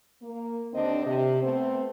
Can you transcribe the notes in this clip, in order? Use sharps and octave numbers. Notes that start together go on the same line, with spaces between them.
A#3
D#2 D3 C4 D4 D#5
C3
A3 B3 C4